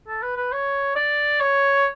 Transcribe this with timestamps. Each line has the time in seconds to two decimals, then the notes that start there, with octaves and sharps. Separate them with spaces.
0.08 A4
0.23 B4
0.37 B4
0.52 C#5
0.96 D5
1.40 C#5